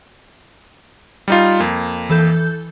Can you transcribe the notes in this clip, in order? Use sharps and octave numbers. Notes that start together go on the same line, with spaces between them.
G3 D#4 F4
F2 A#3
E3 A4 G6